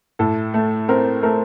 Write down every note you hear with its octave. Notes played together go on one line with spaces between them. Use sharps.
A2 A4
A3
C4 A#4
A3 A#4